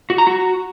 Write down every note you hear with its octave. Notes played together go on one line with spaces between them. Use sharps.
F#4
A#5
F#4